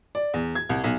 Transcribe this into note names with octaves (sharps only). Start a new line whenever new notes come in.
D5
E2
G#6
C2
B1